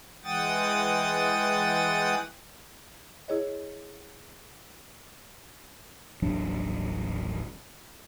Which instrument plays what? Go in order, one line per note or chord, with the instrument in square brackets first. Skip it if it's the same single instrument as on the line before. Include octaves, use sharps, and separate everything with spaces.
[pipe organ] E3 G#3 F#5 G5 D#6 A6
[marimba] E4 G#4 C#5 D#5
[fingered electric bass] D#1 A1 F#3 D4